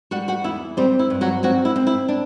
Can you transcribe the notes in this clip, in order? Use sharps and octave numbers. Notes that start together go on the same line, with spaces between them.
G3 F#4 F#5
F#4 F#5
E2 E4 E5
G3 C4 G4
E4
G2
F#3 F#4
F#3 C4 F#4
E4
C4
E4
D4